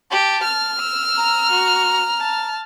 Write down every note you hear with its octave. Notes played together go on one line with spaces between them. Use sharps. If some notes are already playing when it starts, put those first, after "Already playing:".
G4 A5
F6
E6
A#5
F#4
A5